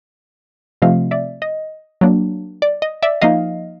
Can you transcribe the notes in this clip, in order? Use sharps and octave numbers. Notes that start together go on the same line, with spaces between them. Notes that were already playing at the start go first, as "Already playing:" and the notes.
C3 F3 A3 C4 F4 D#5 F5
D5 E5
D#5
F#3 A#3 D4
D5
D#5
D5 E5
F3 A#3 D#4 D#5 F5